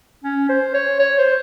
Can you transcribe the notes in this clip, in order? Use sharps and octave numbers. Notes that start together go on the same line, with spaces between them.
C#4
C5
C#5
C#5
C5